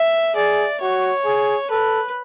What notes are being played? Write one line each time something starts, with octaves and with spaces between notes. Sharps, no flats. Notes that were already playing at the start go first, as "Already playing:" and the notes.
Already playing: E5
G#4 D5
F#4 C#5
G#4
A4 B4